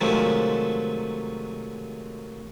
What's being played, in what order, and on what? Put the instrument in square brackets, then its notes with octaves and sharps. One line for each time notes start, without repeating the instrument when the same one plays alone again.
[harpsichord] C3 D#3 F3 F#3 G#3 A3